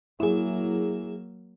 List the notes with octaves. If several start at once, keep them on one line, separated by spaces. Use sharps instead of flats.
F#3 A#3 E4 G#4